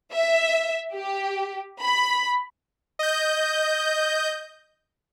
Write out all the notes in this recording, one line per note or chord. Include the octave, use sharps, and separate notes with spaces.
E5
G4
B5
D#5 G6